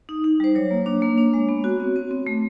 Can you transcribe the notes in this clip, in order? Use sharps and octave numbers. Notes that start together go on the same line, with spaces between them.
D#4
D#4
G3 C5
F#3 C#5
A#3
D4
A#3
D4
G#3
B3
F#4
C4
C4
C4
A3